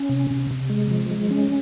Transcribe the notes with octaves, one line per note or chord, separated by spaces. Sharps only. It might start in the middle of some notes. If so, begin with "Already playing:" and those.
Already playing: C#4
C3
C3
C3
G#3
F3
G#3
C#4